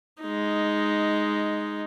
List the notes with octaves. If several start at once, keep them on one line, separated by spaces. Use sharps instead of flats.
G#3 D#4